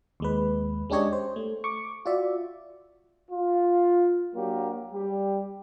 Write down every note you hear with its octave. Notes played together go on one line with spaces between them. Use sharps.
D#2 G#3 B4
G#3 C#4 D4 G4 C#5 D#5
C5
A3
C#6 D6
F4 F#4 D5 E5
F4
F#3 A#3 D4 G4
G3 G4